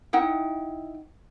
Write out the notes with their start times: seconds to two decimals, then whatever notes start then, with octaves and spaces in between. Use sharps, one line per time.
0.13 D#4 E4 F#5 G5